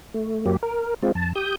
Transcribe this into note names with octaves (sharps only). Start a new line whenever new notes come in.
A3
F#2 F#3 A#3 G4
A#4
G#3 C4 F4
F2 A5
G4 D#6 G6